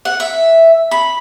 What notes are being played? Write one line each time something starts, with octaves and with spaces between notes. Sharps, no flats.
F#5
E5
B5